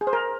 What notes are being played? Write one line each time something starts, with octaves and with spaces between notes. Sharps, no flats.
G#4
C5
A#4